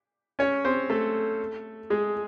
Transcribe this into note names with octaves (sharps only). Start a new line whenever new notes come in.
C#4 C#5
C4 C5
A3 A4
G#3 G#4